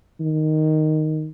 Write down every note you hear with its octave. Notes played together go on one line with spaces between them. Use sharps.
D#3